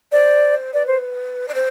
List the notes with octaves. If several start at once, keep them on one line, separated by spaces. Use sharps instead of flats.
C5 D5
B4 D5
C5
D5
C5